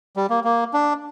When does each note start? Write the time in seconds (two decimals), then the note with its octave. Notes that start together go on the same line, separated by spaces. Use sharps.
0.16 G3
0.30 A#3
0.44 A#3
0.74 D4